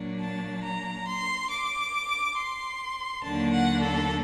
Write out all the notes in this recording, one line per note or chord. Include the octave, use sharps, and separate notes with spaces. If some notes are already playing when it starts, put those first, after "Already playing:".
Already playing: A#2 F#3 A#3 D4
A5
A#5
C6
D6
C6
D#2 D3 F#3 A#3 D4 A5
F#5
A4